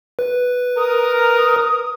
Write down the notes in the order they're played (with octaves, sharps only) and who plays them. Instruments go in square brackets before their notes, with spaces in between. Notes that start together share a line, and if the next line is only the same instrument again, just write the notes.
[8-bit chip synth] B4
[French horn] A#4 [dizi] D#6